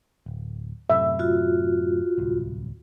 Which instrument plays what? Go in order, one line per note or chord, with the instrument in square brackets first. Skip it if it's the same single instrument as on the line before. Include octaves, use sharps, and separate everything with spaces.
[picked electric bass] D1
[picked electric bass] F#2 A2 C3 [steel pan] E5
[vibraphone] F4 F#4
[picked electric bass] D1 C2